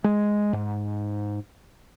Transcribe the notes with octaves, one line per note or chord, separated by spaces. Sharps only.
G#3
G#2